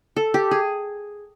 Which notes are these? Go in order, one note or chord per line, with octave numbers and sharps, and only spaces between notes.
A4
G4
G#4